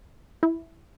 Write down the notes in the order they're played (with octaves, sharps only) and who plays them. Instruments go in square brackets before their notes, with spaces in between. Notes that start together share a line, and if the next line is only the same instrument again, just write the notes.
[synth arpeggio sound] E4